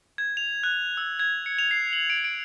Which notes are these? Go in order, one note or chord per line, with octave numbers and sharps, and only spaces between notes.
G#6
F7
F#6
E6
G#6
C#7
F7
C7
F#7
D7
D7